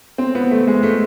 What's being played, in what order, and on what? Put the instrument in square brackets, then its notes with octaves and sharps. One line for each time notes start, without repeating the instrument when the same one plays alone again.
[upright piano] C4
B3
A3
G#3
A3